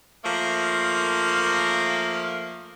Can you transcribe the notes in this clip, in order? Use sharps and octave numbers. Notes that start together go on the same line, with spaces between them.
F3 A3 A#3